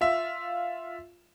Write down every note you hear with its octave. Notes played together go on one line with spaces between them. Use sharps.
F4 E5